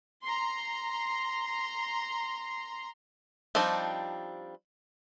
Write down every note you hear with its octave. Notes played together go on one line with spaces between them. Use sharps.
A#5 C6
F3 G3 C4 D4 D#4